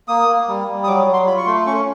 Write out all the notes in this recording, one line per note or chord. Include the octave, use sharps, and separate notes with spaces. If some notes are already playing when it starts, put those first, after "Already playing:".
A#3 D#6
A#3
G3
G3
D#6
F#3 D6
F#3
C6
F4 B5
C#6
A3 C6
C#4 C#6